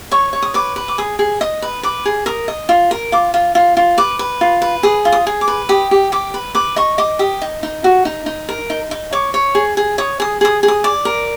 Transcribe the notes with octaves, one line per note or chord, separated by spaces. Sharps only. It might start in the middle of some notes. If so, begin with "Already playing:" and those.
C#5 C#6
C#5
D#6
B4 D6
B4
D6
G#4 D#6
G#4
D#5 D#6
B4
B4 D6
G#4
A#4 D#6
D#5
F4
A#4
F4 D6
F4
F4
F4
B4 D6
B4
F4
B4
G#4 D#6
F4
D#6
G#4
D6
B4
G4 D#6
G4
G4 D6
B4
B4 D6
D#5 C#6
D#5 D6
G4 D#6
D#4
D#4
F#4
D#4
D#4
A#4
D#4
D#4
C#5 D6
C#5
G#4
G#4
C#5 D#6
G#4 D#6
G#4 D#6
G#4
D#6
D5 D6
A#4